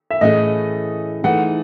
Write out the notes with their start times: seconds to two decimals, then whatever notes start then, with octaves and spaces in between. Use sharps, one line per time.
0.11 E5
0.21 A2 E3 A3 C#4 G#4 D#5
1.24 E3 A3 D#4 G#4 F#5